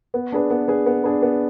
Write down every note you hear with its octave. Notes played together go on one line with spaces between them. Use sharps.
B3
D4 G#4 B4
B3
D4 G#4 B4
B3
D4 G#4 B4
B3